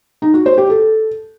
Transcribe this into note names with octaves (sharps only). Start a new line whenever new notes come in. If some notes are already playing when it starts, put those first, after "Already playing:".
D#4
F#4
C5
G4
A4